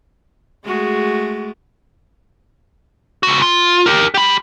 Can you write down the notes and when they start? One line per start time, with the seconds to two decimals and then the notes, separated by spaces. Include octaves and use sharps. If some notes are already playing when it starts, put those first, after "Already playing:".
0.65 G#3 A3 F#4 G#4
3.23 C#2 F#4
3.42 F4
3.86 G4 A#4
4.14 G4 B5